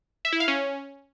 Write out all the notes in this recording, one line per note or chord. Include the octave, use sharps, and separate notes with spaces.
E5
E4
F5
C#4